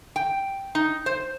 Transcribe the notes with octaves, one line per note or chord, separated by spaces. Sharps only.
G5
D#4
C5